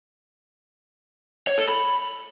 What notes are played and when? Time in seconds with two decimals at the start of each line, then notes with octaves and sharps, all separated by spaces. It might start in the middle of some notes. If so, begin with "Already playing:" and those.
1.47 C#5
1.58 A4
1.68 B5